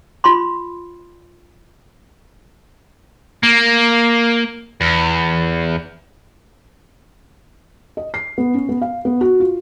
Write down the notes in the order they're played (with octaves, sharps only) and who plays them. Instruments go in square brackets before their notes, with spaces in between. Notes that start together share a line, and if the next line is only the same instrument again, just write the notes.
[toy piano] F4 B5 C6
[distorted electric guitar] A#3
E2
[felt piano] D#5
C7
B3
C#4
B3
F5
B3
F#4
F4